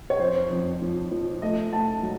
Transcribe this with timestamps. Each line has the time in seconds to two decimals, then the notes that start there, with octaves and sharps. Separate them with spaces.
0.10 C#5
0.19 F2 C5
0.50 F2
0.81 F3
1.11 F3
1.42 A3 D#5
1.72 A3 A5
2.03 F#3